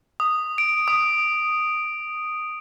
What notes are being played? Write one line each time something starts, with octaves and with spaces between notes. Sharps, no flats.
D#6
D7
D#6